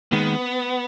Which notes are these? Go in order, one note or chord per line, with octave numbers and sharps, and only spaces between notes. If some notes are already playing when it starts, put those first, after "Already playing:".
D#2 D#3 G#3 B3